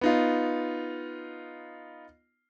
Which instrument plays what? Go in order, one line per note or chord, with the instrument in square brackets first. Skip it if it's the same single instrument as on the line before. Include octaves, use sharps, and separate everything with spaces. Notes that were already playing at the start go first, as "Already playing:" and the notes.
[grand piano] B3 D#4 F4